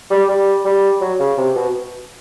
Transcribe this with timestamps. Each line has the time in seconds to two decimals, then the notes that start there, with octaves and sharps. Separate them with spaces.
0.11 G3
0.29 G3
0.65 G3
1.01 F#3
1.19 C#3
1.38 C3
1.56 B2